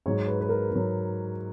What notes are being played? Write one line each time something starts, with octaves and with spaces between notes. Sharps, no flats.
G#2 F#3 C#5
B4
B4
A#4
G#2 F#3